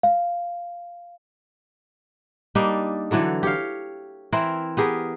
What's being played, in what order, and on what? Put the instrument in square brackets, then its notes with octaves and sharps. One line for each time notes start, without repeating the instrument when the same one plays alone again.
[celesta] F5
[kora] G3 A#3 D4 D#4
D3 E3 F#3 A4
G4 C#5 F5
E3 C4 E4 A#4
B3 G4 G#4 A#4